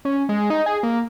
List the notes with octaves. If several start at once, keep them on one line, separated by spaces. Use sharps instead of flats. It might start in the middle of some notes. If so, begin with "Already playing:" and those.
C#4
G#3
D#4
G#4
A#3